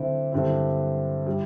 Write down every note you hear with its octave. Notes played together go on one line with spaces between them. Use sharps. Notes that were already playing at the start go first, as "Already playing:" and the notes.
Already playing: D3 C4 E4
G2 D3 C4 E4
G3 E4